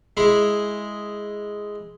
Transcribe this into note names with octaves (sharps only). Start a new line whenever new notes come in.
G#3 E4 G#4